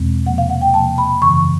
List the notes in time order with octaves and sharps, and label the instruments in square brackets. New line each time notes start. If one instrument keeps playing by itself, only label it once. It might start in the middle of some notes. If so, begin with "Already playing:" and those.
Already playing: [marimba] E2 B2 G#3 C4
C3 F3 A#3 F#5
F5
F#5
G5
C3 F3 A#3 A5
B5
F#2 C#3 E3 C#6